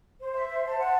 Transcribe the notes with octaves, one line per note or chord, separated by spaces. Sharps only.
C5
E5
C5
A5
F#5